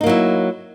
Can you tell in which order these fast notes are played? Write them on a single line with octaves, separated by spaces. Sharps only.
D#4 A#3 F#3 E4